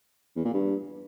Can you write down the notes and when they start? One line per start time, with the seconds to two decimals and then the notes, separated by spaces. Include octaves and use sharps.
0.36 E2
0.45 A#2
0.54 G2